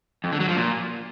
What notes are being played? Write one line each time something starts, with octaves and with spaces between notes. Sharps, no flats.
F2
D3
F#3
F3
A#2